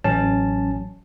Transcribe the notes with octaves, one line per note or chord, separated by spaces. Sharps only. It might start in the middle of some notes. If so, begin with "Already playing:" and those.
A1 F#3 C#4 A5